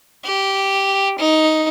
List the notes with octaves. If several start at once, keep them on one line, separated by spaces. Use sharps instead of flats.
G4
D#4